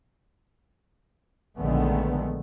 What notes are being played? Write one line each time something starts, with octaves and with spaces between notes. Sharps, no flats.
A#1 D3 D#3 G#3 A3 B3